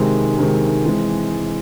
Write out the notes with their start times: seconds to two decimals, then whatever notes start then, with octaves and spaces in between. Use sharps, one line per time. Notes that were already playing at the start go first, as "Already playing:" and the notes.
Already playing: C3 D#3 G#3
0.38 C3 D#3 G#3
0.86 E3 G#3 C4